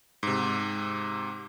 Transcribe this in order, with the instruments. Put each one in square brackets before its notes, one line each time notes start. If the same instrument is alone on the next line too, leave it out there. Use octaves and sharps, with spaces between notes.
[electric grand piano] G#2 C3